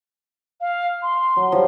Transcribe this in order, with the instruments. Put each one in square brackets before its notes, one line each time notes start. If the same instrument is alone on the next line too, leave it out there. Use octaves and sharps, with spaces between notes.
[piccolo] F5
C6
[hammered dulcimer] F#3
F3 G3